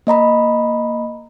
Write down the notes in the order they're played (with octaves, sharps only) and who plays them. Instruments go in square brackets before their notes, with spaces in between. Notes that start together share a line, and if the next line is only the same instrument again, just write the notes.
[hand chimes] A#3 D#5 A#5 B5